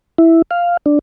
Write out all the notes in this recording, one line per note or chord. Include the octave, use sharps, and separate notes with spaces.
E4
F5
D4